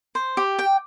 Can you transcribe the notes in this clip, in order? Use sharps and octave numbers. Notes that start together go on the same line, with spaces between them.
C5
G4
G5